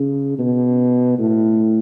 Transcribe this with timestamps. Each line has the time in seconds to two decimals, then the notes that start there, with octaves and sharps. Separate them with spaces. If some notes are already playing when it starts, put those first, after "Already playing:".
Already playing: C#3
0.38 B2
1.18 A2